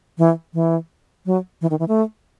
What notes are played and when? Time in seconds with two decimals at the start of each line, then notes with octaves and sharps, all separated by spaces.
0.18 E3
0.54 E3
1.26 F#3
1.61 E3
1.71 D#3
1.79 E3
1.88 A3